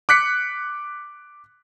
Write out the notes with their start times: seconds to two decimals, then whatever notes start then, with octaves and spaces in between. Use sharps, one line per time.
0.09 D6 F#6 B6 C#7